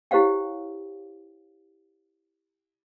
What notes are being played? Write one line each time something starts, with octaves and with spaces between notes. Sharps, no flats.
E4 G4 C5 C#5 F5 G5